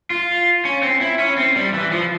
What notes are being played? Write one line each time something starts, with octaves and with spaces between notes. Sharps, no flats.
F4
C#4
C4
E4
C#4
C4
G3
E3
F3